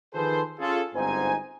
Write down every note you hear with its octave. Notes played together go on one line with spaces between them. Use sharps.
D#3 F3 G#4 A4 B4 C5
C#4 F4 G#4 A4
G1 G#2 C4 D#4 C5 G#5